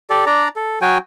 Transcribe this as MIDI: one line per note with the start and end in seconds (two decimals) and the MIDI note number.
0.10 0.25 67
0.10 0.25 69
0.10 0.25 74
0.26 0.48 62
0.26 0.48 74
0.26 0.48 82
0.56 0.79 69
0.81 0.98 54
0.81 0.98 66
0.81 0.98 79
0.81 0.98 80